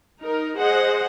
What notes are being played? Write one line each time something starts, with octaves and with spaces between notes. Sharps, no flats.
D#4 A#4
G#4 C5 D#5 F#5